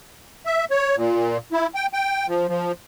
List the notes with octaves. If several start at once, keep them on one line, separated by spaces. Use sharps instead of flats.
E5
C#5
A#2
E4
G5
G5
F3
F3